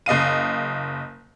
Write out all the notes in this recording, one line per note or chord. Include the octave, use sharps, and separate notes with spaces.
F#1 D#5 F5 D#7